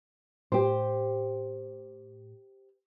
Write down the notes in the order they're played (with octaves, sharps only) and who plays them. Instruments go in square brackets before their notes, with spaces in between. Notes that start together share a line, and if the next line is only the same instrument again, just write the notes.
[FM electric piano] A2 [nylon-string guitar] G4 C5